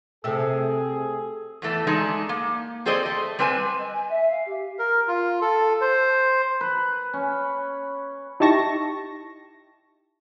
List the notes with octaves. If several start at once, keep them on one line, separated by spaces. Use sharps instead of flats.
C3 A3 G#4 A4 E6
E2 E3 A3
G#3 A3 D4 D#4 G#4
A#3
C4 G#4 A4 C5 D5 D#5
A3
G3 C4 B4 F5 G#5
D#5
G#5
E5
F5
G4
A#4
F4
A4
C5
B4
C#4
D#4 E4 G4 A5 C#6 A#6